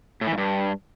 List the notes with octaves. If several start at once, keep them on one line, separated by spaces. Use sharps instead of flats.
A2
E3
G#2
G2